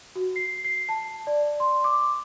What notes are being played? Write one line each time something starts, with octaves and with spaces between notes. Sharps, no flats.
F#4
C7
C7
A5
D5
C6
D6